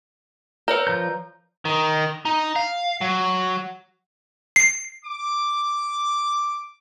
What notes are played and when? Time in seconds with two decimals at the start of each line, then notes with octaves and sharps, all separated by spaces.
0.68 A#4 B4 C#5 D5
0.87 F3 A#5 G6
1.65 D#3
2.25 D#4
2.56 F5
3.01 F#3
4.56 C7
5.05 D6